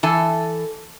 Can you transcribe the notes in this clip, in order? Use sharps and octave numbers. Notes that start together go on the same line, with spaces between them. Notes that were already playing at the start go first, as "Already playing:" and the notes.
E3 A4 G#5